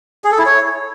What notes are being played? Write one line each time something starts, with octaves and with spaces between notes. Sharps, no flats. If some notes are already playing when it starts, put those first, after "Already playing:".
G#4
A4
E4
C#5